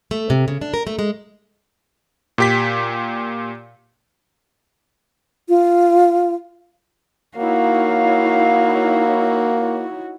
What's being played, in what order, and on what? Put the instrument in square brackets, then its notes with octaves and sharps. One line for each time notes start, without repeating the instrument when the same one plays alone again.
[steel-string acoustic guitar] A3
C3
C#3
D4
A#4
A3
G#3
[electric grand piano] A#2 G4 B6
[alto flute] F4
[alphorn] A#3 [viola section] D#4 E4 C#5 [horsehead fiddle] F#4 [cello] F5